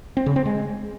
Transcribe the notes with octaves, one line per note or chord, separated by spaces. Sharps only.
C4
C#3
C4
G#3